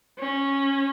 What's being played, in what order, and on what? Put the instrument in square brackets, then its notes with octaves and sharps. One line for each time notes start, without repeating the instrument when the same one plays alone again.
[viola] C#4